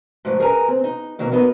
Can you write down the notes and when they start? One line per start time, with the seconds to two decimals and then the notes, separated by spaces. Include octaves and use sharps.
0.25 G#2 F3 F#3 A3
0.40 G#4 A#4 B4 G#5 A#5
0.68 C4
0.84 D#4
1.19 B2 D#3 F#3 A#3
1.32 F#3 B3 D#4 A#4 D#5